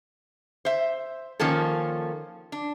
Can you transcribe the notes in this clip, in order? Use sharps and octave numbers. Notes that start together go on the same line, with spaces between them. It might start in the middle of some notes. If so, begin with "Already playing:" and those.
C5 E5
D#3 F3 A#3 C#4 A4
D4